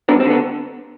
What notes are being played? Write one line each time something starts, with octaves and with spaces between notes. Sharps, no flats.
G2 B3 D4
C4
D3
B3